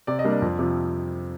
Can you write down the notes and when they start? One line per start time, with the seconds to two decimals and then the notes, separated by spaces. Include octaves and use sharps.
0.07 C3 D5
0.19 D#5
0.25 G3 A#3 D4
0.30 D5
0.42 F2
0.59 C3 F3